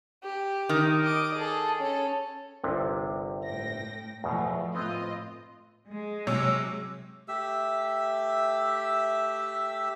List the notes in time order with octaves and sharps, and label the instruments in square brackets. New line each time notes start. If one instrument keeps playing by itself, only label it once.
[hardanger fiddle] G4
[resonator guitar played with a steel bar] D#3
[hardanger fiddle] D#5 D6
G#4 A4
C#4 A4
[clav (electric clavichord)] G1 C2 C3
[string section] A2 G5 A#6
[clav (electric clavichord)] E2 B2 [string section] F3 A3
[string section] A2 F4 D#5 [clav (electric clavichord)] B3 C4
[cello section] G#3
[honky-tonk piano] C3 F#3 C#5 [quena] E6
[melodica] A3 G4 E5 E6